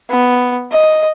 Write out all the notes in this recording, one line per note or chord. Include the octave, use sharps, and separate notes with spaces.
B3
D#5